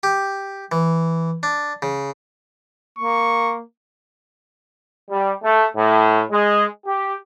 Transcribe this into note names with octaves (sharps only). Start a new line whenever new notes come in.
G4
E3
D4
C#3
A#3 C#6
G3
A3
A2
G#3
G4